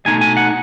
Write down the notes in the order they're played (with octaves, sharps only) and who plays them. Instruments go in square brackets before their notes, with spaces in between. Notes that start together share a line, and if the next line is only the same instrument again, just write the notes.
[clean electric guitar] B2 A3 D#4 G#5
G#5
F#5